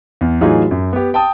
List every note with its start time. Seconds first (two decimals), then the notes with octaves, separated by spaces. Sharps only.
0.21 E2
0.41 A2 E3 F#3 D#4 F4 G#4
0.71 F#2
0.93 B3 G4
1.14 G5 A5 D#6